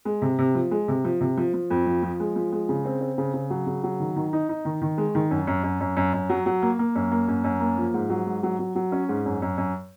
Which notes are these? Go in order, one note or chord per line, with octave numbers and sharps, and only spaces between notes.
G#3
C3
C3
F3
G#3
C3
F3
C3
F3
F3
F2
F3
F3
G#3
F3
G#3
C#3
C4
C4
C#3
C#3
F#3
C#3
F#3
D#3
D#3
D#4
D#4
D#3
D#3
G#3
D#3
F#2
F#2
F#2
F#2
F#2
F#2
F#3
F#3
A#3
A#3
F#2
A#3
F#2
F#2
A#3
F3
G#2
F#3
G#2
F#3
F#3
F#3
C#4
G#2
F#2
F#2
F#2